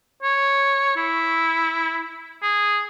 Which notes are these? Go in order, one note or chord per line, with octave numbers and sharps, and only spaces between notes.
C#5
E4
G#4